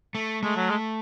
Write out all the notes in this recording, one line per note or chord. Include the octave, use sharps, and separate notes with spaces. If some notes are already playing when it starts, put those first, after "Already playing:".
A3
G#3 A3
F#3
G#3